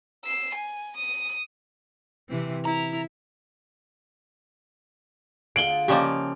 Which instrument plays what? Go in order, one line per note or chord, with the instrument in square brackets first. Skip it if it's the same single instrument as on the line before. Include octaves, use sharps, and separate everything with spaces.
[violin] E6 C7
G#5
D#6
[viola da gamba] C3 E3 C4
[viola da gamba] E4 [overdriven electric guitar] A#5
[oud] D3 F4 G#4 [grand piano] D7 F#7 G7
[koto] C#3 F3 A#3 [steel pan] G4 D5 D#5